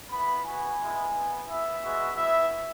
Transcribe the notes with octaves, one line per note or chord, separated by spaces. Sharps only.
B3 E4 B5
B3 F#4 G#5
G#3 B3 E4
B3 E4
B3 E4 E5
G#3 B3 F#4
B3 E4 E5